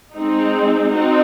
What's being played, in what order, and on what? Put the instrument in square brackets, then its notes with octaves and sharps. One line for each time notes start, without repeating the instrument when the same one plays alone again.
[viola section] G#3 C4 D#4
C4 D#4 F#4